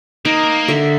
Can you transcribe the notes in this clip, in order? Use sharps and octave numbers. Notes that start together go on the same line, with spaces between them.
A#3 D#4
D3 E5